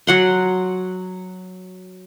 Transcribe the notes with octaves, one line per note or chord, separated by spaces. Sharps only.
F#3 F#5 C6